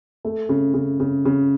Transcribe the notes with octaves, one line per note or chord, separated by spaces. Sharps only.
A3
C#3
C#3
C#3
C#3